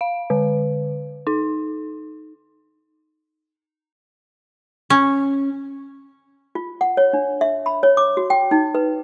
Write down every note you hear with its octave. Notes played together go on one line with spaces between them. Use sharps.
F5
D3
D#4
C#4
F4
F#5
C#5
D4
E5
B5
C#5
D6
F#4
G5
D#4
B4